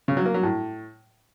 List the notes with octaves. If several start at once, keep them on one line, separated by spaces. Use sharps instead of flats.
C#3
F#3
A#3
F#3
A2